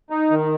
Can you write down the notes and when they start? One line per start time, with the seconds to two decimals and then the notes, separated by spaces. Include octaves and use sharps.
0.10 D#4
0.31 D#3